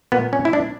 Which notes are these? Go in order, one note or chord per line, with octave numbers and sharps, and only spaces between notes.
A#2 A#3 B3
C#4
E4
D4